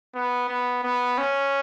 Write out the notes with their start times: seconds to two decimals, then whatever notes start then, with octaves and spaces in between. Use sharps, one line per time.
0.15 B3
0.48 B3
0.83 B3
1.18 C#4